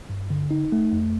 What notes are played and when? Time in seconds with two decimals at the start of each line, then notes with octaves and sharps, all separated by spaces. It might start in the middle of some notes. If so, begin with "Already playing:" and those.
0.10 G2
0.30 D3
0.51 D#4
0.72 A3
0.93 F2